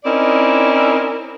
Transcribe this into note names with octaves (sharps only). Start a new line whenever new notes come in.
C4 C#4 D#4 E4 A#4 D5